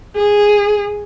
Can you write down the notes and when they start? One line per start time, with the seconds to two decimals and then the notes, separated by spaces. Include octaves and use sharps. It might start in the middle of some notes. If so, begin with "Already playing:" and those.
0.16 G#4